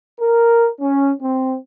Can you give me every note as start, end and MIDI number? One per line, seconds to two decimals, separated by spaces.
0.20 0.68 70
0.80 1.11 61
1.21 1.55 60